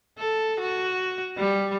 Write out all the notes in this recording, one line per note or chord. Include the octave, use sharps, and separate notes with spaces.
A4
F#4
G3